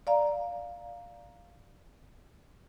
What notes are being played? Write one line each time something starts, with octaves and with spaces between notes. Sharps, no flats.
D5 F5 A#5